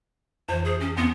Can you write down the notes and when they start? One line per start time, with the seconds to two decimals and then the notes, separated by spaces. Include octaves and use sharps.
0.49 F2 E3 C5
0.65 G#4
0.80 C#4
0.97 E2 B3 C4 A#6